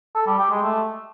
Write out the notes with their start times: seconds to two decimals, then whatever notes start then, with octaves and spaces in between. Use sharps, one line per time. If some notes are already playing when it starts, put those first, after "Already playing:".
0.15 A4
0.27 G3
0.39 G4
0.50 G#3
0.62 A3